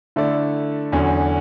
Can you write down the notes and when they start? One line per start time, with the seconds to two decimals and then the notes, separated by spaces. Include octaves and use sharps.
0.16 D3 A3 E4 A4 D5
0.92 E2 D3 F#3 C#4